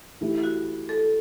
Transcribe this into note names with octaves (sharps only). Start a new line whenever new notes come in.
E3 A3 E4 G4
F#4
A4